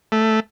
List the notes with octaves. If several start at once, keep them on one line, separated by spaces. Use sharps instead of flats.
A3